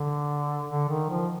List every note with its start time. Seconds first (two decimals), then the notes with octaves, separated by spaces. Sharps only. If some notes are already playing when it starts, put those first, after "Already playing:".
Already playing: D3
0.69 D3
0.89 D#3
1.10 F3